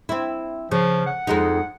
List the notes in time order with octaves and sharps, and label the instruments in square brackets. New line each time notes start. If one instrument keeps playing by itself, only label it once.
[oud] C4 E4
[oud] C#3 [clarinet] F3
[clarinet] F#5
[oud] F2 G#3 D#4